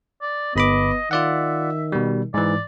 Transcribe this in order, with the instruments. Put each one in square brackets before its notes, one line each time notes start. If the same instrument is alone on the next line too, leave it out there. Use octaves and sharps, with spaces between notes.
[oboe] D5
[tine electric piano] G1 B5 D6 [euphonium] B3 [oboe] D#5
[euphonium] D#3 [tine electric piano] F4 D5 F#5 [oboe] E5
[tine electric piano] B2 G3
[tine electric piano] G#2 E3 [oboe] D5